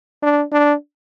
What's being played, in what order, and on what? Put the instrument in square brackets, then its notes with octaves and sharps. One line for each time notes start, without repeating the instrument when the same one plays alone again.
[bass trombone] D4
D4